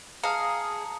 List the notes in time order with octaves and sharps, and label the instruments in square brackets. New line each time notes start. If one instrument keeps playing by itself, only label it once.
[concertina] G#4 [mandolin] F5 [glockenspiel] A5 C#7 [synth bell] A#5 D#6